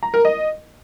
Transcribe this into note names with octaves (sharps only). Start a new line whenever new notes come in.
A#5
A#4
D#5